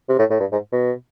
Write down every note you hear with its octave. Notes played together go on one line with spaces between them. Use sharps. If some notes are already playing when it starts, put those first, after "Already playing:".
C3
A2
A2
G2
G#2
B2